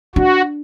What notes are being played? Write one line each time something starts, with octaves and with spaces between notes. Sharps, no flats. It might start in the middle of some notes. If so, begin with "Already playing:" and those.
D4 F#4